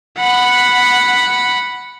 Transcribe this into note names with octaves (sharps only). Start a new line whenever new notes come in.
F#5 B5